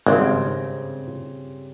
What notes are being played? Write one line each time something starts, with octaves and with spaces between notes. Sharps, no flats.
G#1 G2 C#3 C4